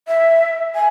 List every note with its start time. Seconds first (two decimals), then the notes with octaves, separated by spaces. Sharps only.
0.08 E5
0.75 G#5